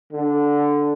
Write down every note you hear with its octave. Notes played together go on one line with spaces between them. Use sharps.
D3